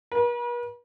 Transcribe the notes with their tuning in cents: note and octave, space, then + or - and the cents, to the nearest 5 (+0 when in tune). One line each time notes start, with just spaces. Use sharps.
B4 -45